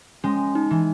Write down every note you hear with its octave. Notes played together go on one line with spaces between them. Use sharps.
G#3 C#4
D#4
E3